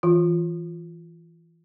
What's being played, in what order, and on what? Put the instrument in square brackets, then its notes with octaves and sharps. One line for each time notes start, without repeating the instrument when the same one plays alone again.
[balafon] E3 F4